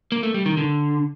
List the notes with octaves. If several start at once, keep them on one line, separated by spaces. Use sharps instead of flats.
A#3
A3
G3
D#3
D3